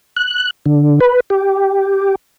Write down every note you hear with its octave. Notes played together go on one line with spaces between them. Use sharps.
F#6
D3
B4
G4